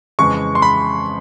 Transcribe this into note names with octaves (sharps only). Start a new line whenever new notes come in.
F2 C#3 E3 G#3 C#6
C6
B5